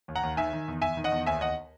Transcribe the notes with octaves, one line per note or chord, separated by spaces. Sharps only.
D#2
F#5 A#5
D#2
D#3 E5 G#5
D#3
E2
E2 E5 G#5
D#3
D#5 F#5
E2
D#2 E5 G#5
D#2 D#5 F#5